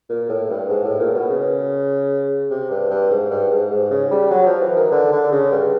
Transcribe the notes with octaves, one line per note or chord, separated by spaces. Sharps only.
A#2
A2
G2
G#2
A2
A#2
B2
C#3
C3
G2
G2
G#2
G2
G#2
G#2
C#3
G3
F#3
F3
E3
D#3
D3
D3
C#3
G2